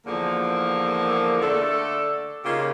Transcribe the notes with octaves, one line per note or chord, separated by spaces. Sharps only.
E2 D3 F3 A#3
D3 A3 A4 D5
C#3 A#3 D#4 F4 G4